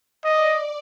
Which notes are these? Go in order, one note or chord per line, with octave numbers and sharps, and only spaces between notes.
D5 D#5